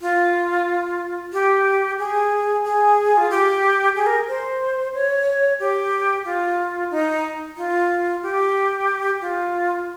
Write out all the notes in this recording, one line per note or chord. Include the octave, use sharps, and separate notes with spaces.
F4
G4
G#4
G#4
F4
G4
G#4
A#4
C5
C#5
G4
F4
D#4
F4
G4
F4